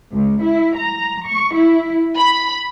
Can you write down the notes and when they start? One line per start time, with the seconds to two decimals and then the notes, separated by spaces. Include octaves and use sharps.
0.13 C#2
0.42 E4
0.76 A#5
1.25 C#6
1.54 E4
2.17 B5